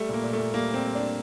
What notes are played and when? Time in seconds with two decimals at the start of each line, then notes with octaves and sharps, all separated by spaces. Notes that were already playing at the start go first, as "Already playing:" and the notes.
Already playing: G3 A3
0.09 A#2
0.14 A#3
0.23 A#2
0.33 A3
0.39 A#2
0.54 G3 A#3
0.70 A#2 C4
0.84 G3
0.95 G3 D4